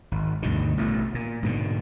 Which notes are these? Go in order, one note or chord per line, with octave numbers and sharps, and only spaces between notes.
G#1
D2 G2 B2 D#3
A1 B2 A3
A#2
G#2 B2 D3